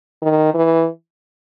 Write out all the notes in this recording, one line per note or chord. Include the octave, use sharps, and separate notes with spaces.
D#3
E3